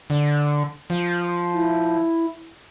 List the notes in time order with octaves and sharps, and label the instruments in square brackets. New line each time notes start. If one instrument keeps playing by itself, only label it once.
[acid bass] D3
F3
[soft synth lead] E4